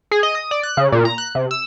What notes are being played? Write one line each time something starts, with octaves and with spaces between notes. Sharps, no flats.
G#4
D#5
D#6
D5
F#6
C#3
A#2
A#5
F#6
C3
E6